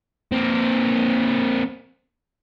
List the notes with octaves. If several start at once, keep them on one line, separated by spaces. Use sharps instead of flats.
A#3 C4